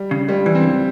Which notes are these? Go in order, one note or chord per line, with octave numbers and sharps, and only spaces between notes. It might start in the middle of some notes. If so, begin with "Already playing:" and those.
Already playing: G3
C#3
C#2 G3
E3
C4
C#2